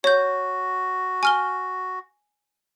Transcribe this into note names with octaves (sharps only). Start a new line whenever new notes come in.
F#4 C#5 G6
G#5 F6 G7